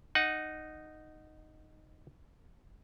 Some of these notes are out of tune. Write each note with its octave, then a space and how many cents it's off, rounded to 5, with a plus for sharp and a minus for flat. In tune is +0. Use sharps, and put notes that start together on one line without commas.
D#4 -10 F#5 +0